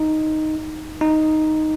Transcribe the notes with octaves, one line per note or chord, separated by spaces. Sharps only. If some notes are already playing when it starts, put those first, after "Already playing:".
Already playing: D#4
D#4